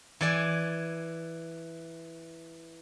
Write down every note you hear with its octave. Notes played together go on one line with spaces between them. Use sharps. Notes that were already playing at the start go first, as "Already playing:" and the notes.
E3 D5 G#5